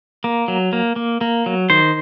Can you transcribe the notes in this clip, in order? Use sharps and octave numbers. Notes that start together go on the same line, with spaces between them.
A#3
F#3
A#3
A#3
A#3
F#3
D#3 C5